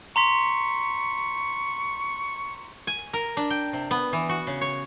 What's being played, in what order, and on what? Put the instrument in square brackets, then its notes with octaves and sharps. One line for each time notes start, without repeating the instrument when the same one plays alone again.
[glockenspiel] A#5 C6 B6 [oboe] C#6
[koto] G#5
A#4
D4
G5
C3
B3
E3
F#4
C#3
C#5